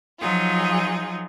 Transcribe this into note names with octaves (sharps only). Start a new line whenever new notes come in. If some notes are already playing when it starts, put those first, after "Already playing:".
F3 F#3 D#4 F4 G#4